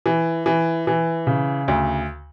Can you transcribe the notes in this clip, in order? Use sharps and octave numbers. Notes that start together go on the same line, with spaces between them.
E3
E3
E3
C#3
D2